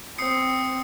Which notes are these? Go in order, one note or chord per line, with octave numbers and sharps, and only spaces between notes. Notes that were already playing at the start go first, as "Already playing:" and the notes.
C4 D#6 C7 C#7